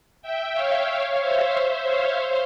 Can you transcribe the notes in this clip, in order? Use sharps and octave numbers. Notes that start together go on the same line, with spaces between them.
E5 G5
C#5 F5
C5 E5
C#5 F5
C5